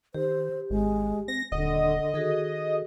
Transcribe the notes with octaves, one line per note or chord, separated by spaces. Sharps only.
D#3 G4 C5
G#1 G#3
C4 A#6
D#1 D3 D#5 F#5
D#3 F#4 G#4 A4